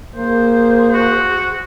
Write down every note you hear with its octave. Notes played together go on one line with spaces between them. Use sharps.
A#3 G#4 C5
F#4